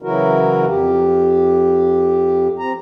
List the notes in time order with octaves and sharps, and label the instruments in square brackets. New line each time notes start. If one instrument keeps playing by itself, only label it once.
[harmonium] C#3 E3 F#3 E4 F#4 A#4
F2 G4
C4 A#5